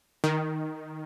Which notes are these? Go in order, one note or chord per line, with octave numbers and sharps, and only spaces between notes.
D#3